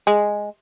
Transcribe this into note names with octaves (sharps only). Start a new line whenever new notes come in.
G#3